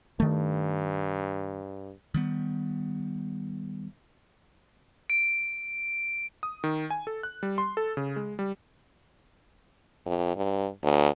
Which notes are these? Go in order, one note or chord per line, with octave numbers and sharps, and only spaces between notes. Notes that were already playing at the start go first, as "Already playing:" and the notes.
G2 D#3 A3
D#3 G3 B3
D7
D#6
D#3
G#5
A4
F#6
G3
C6
A4
C#3
G#3
G3
F2
G2
D2